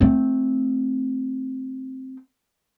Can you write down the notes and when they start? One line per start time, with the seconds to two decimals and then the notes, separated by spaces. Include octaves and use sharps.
0.01 A3 C4